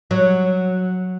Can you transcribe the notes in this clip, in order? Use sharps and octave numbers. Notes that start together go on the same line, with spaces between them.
F#3